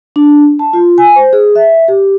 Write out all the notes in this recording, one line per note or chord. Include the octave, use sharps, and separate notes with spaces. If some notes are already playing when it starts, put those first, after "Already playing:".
D4
A5
F4
G#5
C5
G#4
E5
G4